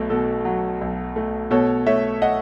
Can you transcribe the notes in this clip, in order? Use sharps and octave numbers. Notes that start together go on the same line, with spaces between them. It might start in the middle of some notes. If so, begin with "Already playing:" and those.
Already playing: B1 A3
B2 A4
F#3
B1
A3
B2 A4 C#5
A3 C#5 E5
D#5 F#5